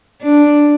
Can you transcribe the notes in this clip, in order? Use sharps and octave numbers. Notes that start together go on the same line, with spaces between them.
D4